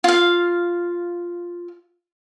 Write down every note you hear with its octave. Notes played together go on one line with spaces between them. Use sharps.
F4 F5